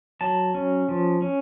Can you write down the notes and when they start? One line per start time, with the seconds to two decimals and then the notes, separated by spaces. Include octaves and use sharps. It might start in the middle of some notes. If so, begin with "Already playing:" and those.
0.21 F#3 A5
0.54 C#4
0.89 F3
1.22 C#4